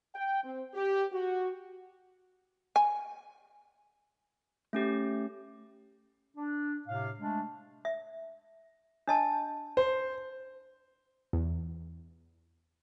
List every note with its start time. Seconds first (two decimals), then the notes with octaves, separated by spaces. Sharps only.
0.15 G5
0.44 C4
0.74 G4
1.12 F#4
2.76 G#5
4.73 A3 C#4 G4
6.37 D4
6.88 A2 C3 F5
7.20 G#3 A3 D4
7.85 E5
9.07 D4 D#5 A5
9.77 C5
11.33 E2